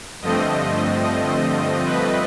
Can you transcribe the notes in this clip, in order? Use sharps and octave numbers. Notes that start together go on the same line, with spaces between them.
G2 D3 F3 A3 C4 D#5
B4